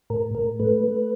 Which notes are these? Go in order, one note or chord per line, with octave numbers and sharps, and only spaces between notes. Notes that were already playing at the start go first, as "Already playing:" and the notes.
A2 A#4
A2 A#4
A3 B4
A3